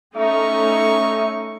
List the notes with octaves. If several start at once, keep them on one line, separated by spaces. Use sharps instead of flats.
A3 C#4 D#4 E5 C#6